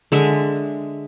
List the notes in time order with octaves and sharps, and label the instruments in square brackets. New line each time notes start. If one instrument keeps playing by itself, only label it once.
[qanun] D3 G#3 E5